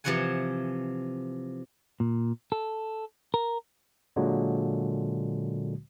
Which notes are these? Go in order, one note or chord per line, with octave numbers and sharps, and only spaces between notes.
C3 E3 F3 C#5 F#5 G#5
A#2
A4
A#4
A#2 D3 F#3 G#3 F#4